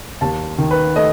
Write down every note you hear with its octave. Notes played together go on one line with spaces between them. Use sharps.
D#2 A5
D#3
B4
A3 D#5